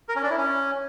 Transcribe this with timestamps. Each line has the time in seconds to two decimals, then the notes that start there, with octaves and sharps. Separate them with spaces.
0.09 A#4
0.16 C#4
0.23 D4
0.30 E4
0.37 C#4